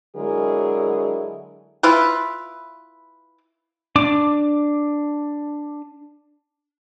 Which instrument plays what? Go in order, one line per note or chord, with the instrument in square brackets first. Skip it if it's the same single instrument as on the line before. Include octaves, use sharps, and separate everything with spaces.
[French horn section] D3 F#3 G#3 E4 G#4 A#4
[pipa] E4 F4 B4
[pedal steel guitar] D4 D6